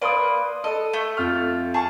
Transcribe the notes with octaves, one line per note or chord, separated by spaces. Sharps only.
A#3 B4 D5 C6 D#6
A4 D#5
A3
F2 F4 F6
G#4 A5 C#6